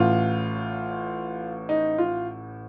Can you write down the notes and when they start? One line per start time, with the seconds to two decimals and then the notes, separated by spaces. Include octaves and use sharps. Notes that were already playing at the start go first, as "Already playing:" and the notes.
Already playing: A1 A2 F4
1.69 D#4
1.98 F4